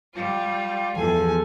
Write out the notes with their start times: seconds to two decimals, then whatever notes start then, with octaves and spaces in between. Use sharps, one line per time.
0.15 G3 F4
0.97 E2 F3 A4 G#5